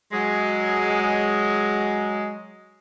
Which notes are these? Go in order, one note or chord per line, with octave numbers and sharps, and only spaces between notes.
F#3 G#3